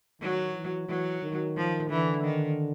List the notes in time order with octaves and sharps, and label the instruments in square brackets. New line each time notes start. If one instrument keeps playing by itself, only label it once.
[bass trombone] D#3 [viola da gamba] F#3
[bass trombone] E3
[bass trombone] E3 [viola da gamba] F#3
[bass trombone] D#3
[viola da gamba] F3
[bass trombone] D3 [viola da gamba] E3
[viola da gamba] D#3